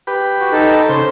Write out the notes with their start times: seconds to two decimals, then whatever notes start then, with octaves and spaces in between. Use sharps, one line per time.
0.07 G4 B4
0.40 F#4
0.52 D#4 A4
0.89 C#3 C5 G6